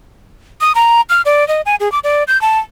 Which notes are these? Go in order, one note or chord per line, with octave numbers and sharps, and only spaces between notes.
D#6
A#5
F6
D5
D#5
G#5
G#4
D6
D5
G6
A5